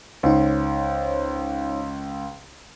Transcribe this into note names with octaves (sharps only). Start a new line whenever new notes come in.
C#2 D#4 C5 C#5